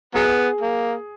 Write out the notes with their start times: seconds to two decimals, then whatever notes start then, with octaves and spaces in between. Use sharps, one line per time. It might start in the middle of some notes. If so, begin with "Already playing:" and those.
0.15 F#3 B3 G#4
0.61 A#3